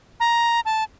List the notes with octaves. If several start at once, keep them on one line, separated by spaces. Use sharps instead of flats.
A#5
A5